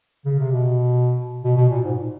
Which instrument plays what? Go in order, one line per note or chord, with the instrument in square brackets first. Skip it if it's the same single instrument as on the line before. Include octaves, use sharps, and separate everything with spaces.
[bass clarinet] C#3
C3
B2
B2
B2
A#2
G#2